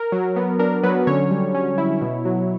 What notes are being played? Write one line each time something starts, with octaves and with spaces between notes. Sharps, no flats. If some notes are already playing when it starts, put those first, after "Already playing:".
Already playing: A#4
F#3
B3
D4 A#4
F#3 B3 B4
D3 C#4 C#5
G3
C#4
E4
B2
F#3